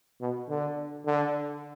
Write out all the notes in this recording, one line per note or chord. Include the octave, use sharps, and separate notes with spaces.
B2
D3
D3